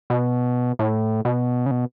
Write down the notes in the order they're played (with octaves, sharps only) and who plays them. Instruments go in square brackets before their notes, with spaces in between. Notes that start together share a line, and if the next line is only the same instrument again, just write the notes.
[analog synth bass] B2
A2
B2
C#3
B2